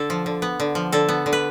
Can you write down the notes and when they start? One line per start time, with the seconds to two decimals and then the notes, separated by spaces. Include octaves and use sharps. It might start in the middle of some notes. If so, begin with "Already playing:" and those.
Already playing: D3 A4
0.10 F3
0.26 D3
0.42 B3
0.60 D3
0.75 F3
0.92 D3 A4
1.09 B3
1.26 D3
1.33 B4